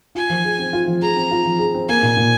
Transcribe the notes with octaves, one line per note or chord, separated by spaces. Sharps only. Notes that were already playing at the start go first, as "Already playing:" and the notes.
F4 G#5
F3
G#4
C4
F4
F3
G#4 A#5
C4
F4
F3
G#4
C4
A#3 G#5
A#2
A#2